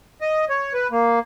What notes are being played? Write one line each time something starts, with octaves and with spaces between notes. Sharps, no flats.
D#5
C#5
B4
A#3